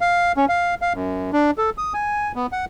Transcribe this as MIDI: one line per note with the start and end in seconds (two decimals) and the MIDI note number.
0.01 0.32 77
0.37 0.45 61
0.49 0.75 77
0.82 0.93 77
0.94 1.31 42
1.33 1.51 62
1.58 1.70 69
1.78 1.93 87
1.94 2.32 80
2.35 2.47 59
2.52 2.65 78